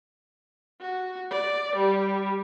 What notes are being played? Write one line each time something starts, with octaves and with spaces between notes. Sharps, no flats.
F#4
D5
G3